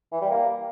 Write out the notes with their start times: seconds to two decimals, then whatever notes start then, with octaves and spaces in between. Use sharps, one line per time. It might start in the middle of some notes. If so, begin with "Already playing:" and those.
0.13 E3
0.22 G3
0.31 A#3